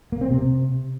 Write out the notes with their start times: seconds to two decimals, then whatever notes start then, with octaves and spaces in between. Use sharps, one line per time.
0.12 A#3
0.21 C4
0.30 C3